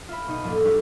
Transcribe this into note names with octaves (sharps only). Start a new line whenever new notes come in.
F4 E5 B5
B2 D#4 D#7
A1 F2 A3 A#3 D5
G3 G#3 C#4 D4 E4 G4